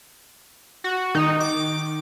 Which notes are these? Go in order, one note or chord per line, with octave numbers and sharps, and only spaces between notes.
F#4
D#3 D#4
D6